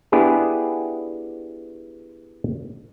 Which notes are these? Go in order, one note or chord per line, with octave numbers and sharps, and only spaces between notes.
B3 D4 E4 G4 G#4